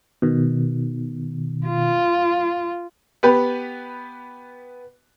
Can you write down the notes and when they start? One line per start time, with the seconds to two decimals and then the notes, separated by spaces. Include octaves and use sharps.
0.22 B2 D#3
1.67 F4
3.23 B3 G4 B4